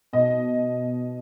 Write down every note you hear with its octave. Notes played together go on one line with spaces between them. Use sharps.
B2 D#5